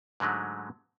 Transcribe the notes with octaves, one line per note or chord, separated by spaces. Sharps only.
G#2 D3 F#3 G#3 A3